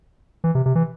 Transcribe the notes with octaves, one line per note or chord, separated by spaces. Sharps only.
E3
C3
C3
E3